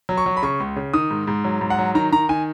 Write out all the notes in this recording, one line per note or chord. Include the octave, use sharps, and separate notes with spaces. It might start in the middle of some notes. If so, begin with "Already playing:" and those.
F#3
C#6
F#3
B5
C#3 C#6
C#2
C#3
D#3 D#6
G#2
G#2
F#3
G#2
F#5
F#3
D#3 A#5
D#3 A#5
D#3 G#5